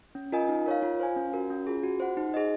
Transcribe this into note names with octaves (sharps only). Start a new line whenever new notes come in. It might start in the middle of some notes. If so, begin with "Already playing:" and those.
C#4
F4 A#4 D#5 G#5
D#4
A#4 C#5 F5
F4
C5 F5 G#5
C#4
F#4 A#4
C#4
F4 G#4
F#4
C5 F#5
D#4
G#4 C5 D#5